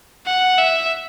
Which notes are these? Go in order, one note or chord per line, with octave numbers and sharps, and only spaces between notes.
F#5
E5